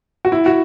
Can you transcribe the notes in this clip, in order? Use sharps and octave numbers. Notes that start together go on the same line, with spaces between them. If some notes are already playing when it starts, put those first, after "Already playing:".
F#4
E4
F#4